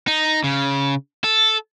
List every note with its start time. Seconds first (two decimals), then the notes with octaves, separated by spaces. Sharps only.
0.08 D#4
0.44 C#3
1.24 A4